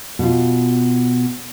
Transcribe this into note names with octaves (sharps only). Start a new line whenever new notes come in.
B2 F4